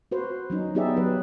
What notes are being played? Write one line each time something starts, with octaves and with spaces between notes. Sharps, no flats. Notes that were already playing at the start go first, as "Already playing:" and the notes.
F#4 B4 C5
F#3 C#4 D#4
B3 D#4 G4 G#4 D5 E5
F#3 B4